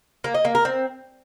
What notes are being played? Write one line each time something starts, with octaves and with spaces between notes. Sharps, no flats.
A#3
D#5
A#3
A#4
C4